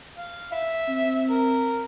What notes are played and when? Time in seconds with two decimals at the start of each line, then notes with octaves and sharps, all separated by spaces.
0.17 F5
0.52 E5
0.88 C4
1.30 A#4